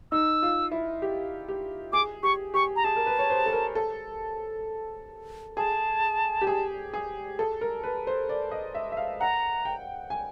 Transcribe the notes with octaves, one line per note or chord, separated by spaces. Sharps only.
D#4 E6
F4
E4
G4
G4
G#4 D6
G4 C#6
G4 C#6
A#5
G#4 A5
A#4
B4
C#5
C5
A4
A#4
A4
G#4 A5
G4
G#4
G#4
A4
A#4
B4
C5
D5
D#5
E5
E5
F5
F#5 A#5
G5
G#5